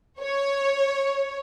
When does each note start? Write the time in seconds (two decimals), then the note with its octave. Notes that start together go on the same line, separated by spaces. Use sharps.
0.21 C#5